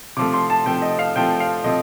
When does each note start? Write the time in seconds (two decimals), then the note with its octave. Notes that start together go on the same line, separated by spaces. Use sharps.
0.17 C3 F3 A3 D6
0.34 C6
0.50 A5
0.66 C3 F3 A3 G5
0.82 D#5
0.99 F5
1.15 C3 F3 A3 G5
1.40 F5
1.64 C3 F3 A3 D#5